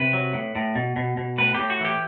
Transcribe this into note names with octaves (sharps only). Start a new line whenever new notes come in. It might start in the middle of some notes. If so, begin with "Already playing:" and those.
Already playing: C3 B4
F#3
A2
A2
B2
B2
B2
A2 B4
A2 G4
F#4
E3 G4